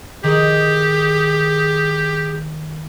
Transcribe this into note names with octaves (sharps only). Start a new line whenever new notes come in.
D#3 G4 G#4